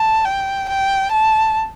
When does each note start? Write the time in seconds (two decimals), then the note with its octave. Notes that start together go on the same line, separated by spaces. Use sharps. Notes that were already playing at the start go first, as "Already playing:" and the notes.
Already playing: A5
0.25 G5
0.69 G5
1.12 A5